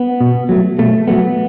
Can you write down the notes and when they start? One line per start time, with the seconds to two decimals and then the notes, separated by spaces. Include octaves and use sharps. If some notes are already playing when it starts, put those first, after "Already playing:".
Already playing: B3
0.21 B2
0.49 F#3 A3
0.79 B2 A3
1.08 F#3 A3 B3